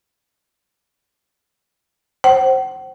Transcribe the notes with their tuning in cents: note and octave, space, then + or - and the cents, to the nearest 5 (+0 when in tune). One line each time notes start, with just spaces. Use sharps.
C5 +20 F#5 +45